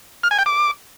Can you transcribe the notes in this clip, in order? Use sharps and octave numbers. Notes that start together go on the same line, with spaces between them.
F6
G#5
G5
D6